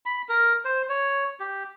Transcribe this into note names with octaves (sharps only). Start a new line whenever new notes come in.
B5
A#4
C5
C#5
G4